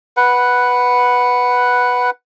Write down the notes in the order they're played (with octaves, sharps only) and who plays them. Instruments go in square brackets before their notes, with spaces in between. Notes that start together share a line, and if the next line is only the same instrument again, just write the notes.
[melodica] B4 F#5